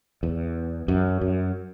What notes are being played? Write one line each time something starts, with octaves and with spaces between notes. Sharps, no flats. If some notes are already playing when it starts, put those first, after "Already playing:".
E2
F#2
F#2